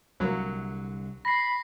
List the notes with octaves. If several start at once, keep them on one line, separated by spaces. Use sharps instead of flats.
C2 D3 F#3 A#3
B5 A#6 C7